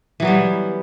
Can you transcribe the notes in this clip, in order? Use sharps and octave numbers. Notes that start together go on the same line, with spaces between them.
E3 F#3 G3 B3